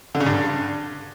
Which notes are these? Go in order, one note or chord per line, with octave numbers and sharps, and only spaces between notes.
D3
C#3
G2